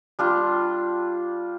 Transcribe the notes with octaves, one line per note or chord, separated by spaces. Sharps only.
G3 D4 F4